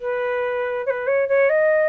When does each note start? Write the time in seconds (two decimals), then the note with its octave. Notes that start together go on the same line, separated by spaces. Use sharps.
0.01 B4
0.86 C#5
0.90 B4
1.07 C#5
1.28 C#5
1.49 D#5